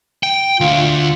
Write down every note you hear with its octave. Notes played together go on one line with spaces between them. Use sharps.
G5
D2 D3 F4